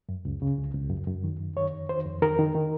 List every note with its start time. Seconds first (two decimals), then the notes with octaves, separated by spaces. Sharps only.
0.09 F#2
0.25 C#2
0.42 C#3
0.58 C#2
0.74 C#2
0.90 F#2
1.07 F#2
1.24 D#3
1.40 F#2
1.56 D#3 C#5
1.73 F2
1.89 D#3 C5
2.06 F2
2.22 D#3 A#4
2.39 D#3
2.55 D#3